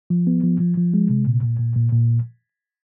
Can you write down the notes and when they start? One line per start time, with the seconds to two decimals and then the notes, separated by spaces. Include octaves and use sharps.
0.10 F3
0.27 B3
0.43 F3
0.60 F3
0.77 F3
0.94 G#3
1.10 C3
1.27 A#2
1.43 A#2
1.59 A#2
1.76 A#2
1.92 A#2